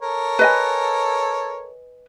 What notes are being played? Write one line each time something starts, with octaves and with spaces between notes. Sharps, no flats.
A4 A#4 C#5
B4 D#5 G#5